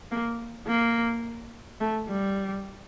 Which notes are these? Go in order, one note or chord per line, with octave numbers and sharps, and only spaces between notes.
A#3
A#3
A3
G3